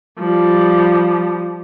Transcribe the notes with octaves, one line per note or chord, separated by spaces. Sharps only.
F3 G3